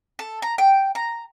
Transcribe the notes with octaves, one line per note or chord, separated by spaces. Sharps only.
A4
A#5
G5
A#5